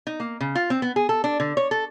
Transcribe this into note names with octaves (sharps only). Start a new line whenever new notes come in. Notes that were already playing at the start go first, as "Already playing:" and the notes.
D#4
A#3
C#3
F4
C4
B3
G#4
A4
D4
D3
C#5
A4